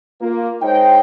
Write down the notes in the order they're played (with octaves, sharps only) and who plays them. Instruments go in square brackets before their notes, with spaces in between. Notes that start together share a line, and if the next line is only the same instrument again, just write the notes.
[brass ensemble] A#3 F4
G#3 D#4 C5 C#5 G5